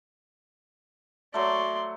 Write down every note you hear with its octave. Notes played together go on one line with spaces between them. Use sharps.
F#3 A3 D5 C6